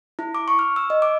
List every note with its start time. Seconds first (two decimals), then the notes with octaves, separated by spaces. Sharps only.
0.19 E4
0.35 D6
0.48 C#6
0.59 F6
0.76 E6
0.90 D#5
1.02 D6